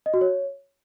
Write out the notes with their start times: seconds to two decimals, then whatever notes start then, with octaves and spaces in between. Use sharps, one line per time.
0.06 D#5
0.14 F#4
0.21 C#5